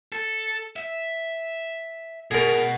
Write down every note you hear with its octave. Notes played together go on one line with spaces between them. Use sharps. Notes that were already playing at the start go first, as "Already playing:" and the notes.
A4
E5
B2 G#4 A#4